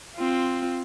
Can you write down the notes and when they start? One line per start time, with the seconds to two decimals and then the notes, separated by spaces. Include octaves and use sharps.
0.16 C4 F4